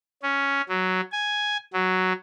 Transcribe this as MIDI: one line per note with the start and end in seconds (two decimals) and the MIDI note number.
0.23 0.62 61
0.69 1.01 54
1.12 1.57 80
1.73 2.13 54